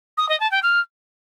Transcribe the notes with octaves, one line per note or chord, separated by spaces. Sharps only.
D#6
D#5
A5
G5
F6